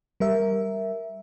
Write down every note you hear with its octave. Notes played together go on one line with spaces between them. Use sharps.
G3 A#4 E5